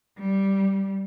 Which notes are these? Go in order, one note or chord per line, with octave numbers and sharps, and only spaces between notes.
G3